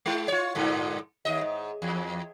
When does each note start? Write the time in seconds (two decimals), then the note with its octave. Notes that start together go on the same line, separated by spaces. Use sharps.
0.06 G#3 E4
0.28 F4 C#5
0.55 G2 A#2 D3
1.25 D#2 D#5
1.41 G#2
1.82 E2